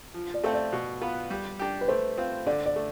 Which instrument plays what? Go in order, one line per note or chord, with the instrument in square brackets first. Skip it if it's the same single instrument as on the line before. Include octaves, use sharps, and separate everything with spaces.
[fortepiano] F3
[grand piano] D5
[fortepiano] A3 C4 F4 A4
[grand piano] D5
[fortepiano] B2
B3 F4 B4
G3
D4 G4
[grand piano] B4
[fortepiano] A3 [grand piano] C5
[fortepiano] C4 F4
[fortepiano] D3 [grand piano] D5
[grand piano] D5
[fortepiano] A3